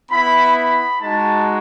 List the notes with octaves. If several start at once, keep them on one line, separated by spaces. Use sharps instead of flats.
B3 E4 B5
B5
G#3 D#4 F#4 A5